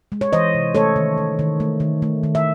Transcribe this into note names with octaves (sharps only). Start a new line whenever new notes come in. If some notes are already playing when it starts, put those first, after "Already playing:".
G#3
C#5
E3 C5 D#5
C3
A3 A4 C#5
D#3
A3
D#3
A3
D#3
A3
D#3
E5